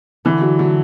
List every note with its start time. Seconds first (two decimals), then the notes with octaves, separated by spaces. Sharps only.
0.25 D3 E3
0.41 F#3
0.59 F#3 A3